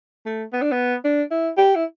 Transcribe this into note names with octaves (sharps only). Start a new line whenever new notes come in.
A3
B3
D4
B3
D4
E4
G4
E4